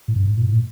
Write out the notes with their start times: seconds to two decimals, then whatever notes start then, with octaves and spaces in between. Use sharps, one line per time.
0.08 A2
0.16 G2
0.27 G#2
0.37 A#2
0.49 A2